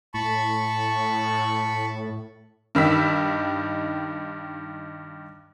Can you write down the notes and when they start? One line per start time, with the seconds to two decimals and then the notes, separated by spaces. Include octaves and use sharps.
0.14 A2 A5 B5 C#6
2.75 G2 D#3 E6 B6